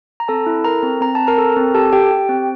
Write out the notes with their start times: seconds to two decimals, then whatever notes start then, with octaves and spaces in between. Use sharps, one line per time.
0.20 A#5
0.28 C4 A4 A5
0.46 E4
0.64 A4 A#4 A#5
0.83 C4
1.01 C4 A#5
1.15 A5
1.20 C4
1.27 A#4 A#5
1.38 A4
1.56 C4
1.74 G4 A4 A5
1.93 G4 G5
2.11 G4
2.29 C4